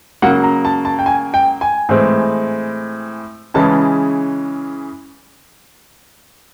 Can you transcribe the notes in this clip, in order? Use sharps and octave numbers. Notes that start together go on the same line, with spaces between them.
C#3 F#3 A#3 F#5
A#5
A5
A5
G5
G#5
G5
G#5
A2 E3 G#3 C4
C#3 E3 G#3 C#4 A5